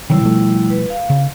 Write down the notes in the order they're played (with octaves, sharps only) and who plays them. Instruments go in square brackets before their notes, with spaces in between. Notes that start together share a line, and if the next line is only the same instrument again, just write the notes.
[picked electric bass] C3 D#3 F#3 [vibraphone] G3 E4
[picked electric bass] B2 F3 A3
[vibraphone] B4
F5
[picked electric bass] C#3